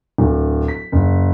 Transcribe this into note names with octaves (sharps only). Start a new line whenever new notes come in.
D1
B6
F#1